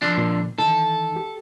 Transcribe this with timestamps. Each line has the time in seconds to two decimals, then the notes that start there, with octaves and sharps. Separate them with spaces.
0.02 D3 F3 D4
0.18 A#2
0.58 D#3 E3 D#4 A4
1.16 G4